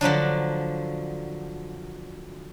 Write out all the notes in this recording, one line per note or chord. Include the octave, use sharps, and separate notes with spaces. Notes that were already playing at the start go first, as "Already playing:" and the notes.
D3 F3 F#3 D4